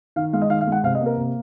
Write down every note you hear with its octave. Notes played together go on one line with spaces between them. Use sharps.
D#3 F5
G#3 F5
D#5
D#3 F5
F5
G#3
F#5
C3 F5
D#5
A#3
A#4
C3